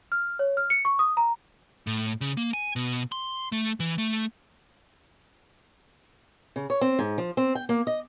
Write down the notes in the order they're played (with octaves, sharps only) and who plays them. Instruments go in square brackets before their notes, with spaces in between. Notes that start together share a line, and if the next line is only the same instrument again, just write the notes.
[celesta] F6
C#5
F6
C#7
C#6
D#6
A#5
[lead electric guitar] A2
C#3
A#3
G#5
B2
C6
A3
E3
A3
[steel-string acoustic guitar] C#3
C#5
C4
G#2
F3
C4
G5
A#3
D#5